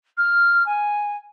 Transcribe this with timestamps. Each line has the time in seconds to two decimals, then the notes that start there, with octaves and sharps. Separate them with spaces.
0.17 F6
0.66 G#5